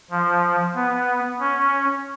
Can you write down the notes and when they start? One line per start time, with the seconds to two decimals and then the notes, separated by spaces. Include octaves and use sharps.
0.10 F3
0.75 B3
1.40 C#4